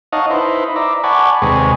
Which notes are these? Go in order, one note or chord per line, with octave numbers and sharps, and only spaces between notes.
D#4 C#5 D#5 F5 F#5 A5
D#4 E4 B4 C5
D5 E5 A#5
D5 F#5 G#5 A5 B5 C#6
D#2 C3 G#3 G#4 B4 C#6